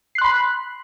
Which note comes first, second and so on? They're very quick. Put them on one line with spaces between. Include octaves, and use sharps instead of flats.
C7 F#6 C6 B5